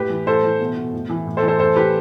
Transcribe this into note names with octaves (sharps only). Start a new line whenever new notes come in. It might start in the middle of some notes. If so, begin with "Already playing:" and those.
Already playing: A2 G4 B4
E3
A2 A4 C5
E3
B2
B2
A2
E3
A2
A4 C5
E3
A4 C5
A2 A4 C5
E3 G4 B4